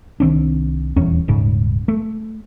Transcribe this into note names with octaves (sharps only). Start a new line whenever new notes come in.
C2 D#3 C4 D4
D#1 E2 C#4
D#1 G#2 C#3
A3